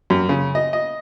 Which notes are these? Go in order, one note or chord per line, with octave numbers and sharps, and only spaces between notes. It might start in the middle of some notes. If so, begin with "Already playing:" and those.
F#2
C#3
D#5
D#5